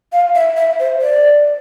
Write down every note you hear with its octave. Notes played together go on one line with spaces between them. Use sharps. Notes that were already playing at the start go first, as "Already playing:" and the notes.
F5
E5
E5
C5
D5